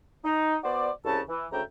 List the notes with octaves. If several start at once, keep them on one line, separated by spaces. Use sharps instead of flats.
D#4
B3 F#4 C5 D5
C2 C#3 A5
E3
D2 G#2 C#3 E5 G5 A#5